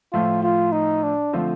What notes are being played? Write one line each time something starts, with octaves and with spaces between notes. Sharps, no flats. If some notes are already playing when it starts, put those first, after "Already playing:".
A2 F3 A3 F4
F4
D#4
D4
D3 F3 A3 C4 F4